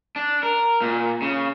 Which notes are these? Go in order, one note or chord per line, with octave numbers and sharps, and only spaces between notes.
D4
A#4
A#2
C#3